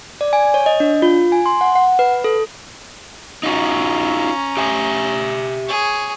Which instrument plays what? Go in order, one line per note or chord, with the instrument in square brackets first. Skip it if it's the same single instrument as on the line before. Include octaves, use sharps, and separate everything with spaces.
[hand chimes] D5
G#5
C#5
D#5
D4
F4
G#5
C6
F#5
F#5
B4
A4
[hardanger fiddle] C#4 A#5 [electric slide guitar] D#4 F4 F#4
[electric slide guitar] G4 E5 G#5
[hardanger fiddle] G#4 C#5